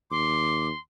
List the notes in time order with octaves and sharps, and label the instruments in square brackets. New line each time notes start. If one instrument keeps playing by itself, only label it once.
[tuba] D#2 [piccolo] C6 [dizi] D6